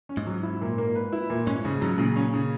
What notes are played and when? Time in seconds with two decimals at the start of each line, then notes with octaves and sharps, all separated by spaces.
0.09 C#4
0.17 G#2
0.26 F#3
0.43 E4
0.61 A#2
0.78 A#3
0.96 B4
1.12 E4
1.30 A#2
1.46 G#2 C#4
1.65 G#2 C#3
1.81 G#2 F#3
1.98 A#2 C#3
2.16 C#4
2.34 C#3